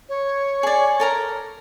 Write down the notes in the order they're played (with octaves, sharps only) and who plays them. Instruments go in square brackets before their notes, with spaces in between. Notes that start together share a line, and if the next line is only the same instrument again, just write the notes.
[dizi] C#5
[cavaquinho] G#4 D5
A4 A#4 A#5